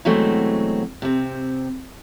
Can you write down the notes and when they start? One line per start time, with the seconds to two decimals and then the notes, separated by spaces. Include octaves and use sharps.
0.05 B2 E3 F#3 G#3 A3 C4
1.02 C3 C4